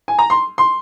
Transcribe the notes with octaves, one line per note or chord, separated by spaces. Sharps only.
G#5
A#5
C6
C6